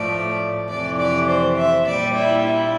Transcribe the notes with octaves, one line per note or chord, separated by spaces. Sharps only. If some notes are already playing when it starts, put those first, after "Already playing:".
Already playing: A2 F3 A3 D5
F2 C3 E3 A3 D5
D5
C5
E5
A#2 G3 D5
E4
E4